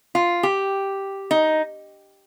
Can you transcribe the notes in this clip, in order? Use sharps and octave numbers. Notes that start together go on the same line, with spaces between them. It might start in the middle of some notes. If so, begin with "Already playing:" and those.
F4
G4
D#4